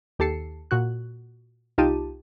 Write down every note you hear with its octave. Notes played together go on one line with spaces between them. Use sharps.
D#2 G4 A4 A5 C7 C#7
A#2 F#4 F#6
C2 D#4 F4 G4 A5 D#7